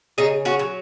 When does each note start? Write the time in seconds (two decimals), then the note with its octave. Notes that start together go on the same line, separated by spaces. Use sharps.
0.18 C#3 D#4 G#4
0.45 C#4 F#4
0.59 F#3